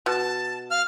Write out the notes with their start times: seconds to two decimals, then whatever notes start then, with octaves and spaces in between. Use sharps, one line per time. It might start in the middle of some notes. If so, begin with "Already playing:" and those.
0.06 B2 A5
0.71 F5 F6